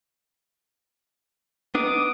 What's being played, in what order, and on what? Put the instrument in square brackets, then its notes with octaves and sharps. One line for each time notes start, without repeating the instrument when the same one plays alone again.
[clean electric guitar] B3 D4 D#4 [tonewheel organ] D6 D#6